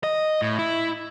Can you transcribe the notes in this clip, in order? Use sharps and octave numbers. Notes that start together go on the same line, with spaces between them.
D#5
A2
E4